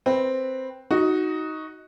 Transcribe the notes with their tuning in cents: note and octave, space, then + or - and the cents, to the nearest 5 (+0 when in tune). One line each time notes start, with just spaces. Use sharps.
C4 +0 B4 +0
D#4 +10 F#4 +0